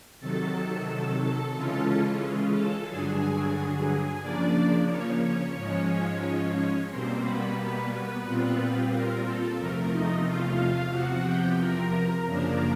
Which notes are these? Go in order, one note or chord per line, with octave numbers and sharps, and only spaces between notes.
C3 D#3 F#3 A4 A5
C#3 E3 G#3 C#4 F4
A4 A5
G2 D3 F#3 G#4 G#5
C#3 F3 A#3 D4 D5
C#4 C#5
C#4 C#5
G#2 F3 G#3
B2 G3 A#3 C4 C5
B3 B4
A#2 G3 C4 F4
A#4
A4
E2 C3 F3 A3 A#4
D#4 D#5
F4 F5
E2 C3 F3 F#4 F#5
G4 G5
A#4 A#5
F#2 C#3 F3 A#3 D4